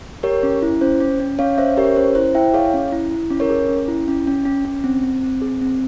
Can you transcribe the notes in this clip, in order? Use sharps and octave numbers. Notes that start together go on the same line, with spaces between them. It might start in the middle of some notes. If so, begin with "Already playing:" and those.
G4 A#4 C#5
C#4
E4
C#4 C5
C#4
C#4
C#4 C#5 F5
C#4 C5 E5
G4 A#4 C#5
C#4 C5
E4 C5
E4 E5 G5
G#4 C#5 F5
C#4
E4
E4
C#4
A#4 C#5
G#4
C#4
E4
C#4
C#4
C#4
C#4
C4
C4
C4
G#4
C4